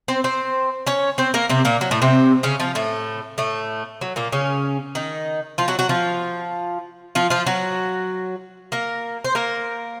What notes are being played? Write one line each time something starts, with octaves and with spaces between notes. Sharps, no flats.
C4 C5
C4 C5
C#4 C#5
C4 C5
A#3 A#4
C3 C4
A#2 A#3
F#3
A2 A3
C3 C4
C#3 C#4
F3 F4
A2 A3
A2 A3
F#3
A#2 A#3
C#3 C#4
D#3 D#4
F3 F4
F#3 F#4
F#3 F#4
F3 F4
F3 F4
F3 F4
F#3 F#4
A#3 A#4
C5
A#3 A#4